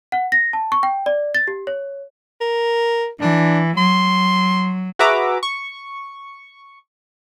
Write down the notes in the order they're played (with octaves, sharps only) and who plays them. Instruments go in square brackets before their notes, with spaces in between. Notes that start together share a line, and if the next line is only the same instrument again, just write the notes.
[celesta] F#5
A#6
A5
C#6
G5
D5
A6
G4
C#5
[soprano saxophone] A#4
[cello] E3 [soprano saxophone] D4
[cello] F#3 [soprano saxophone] C6
[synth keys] F#4 G#4 B4 E5 A#5 D6
C#6